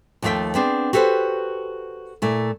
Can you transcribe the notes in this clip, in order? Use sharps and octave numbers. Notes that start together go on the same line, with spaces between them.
D#2 F3 A3 G#4 E5 G5
B3 C4 D4 G#4
F#4 G4 A4 B4 C5
A#2 A3 E4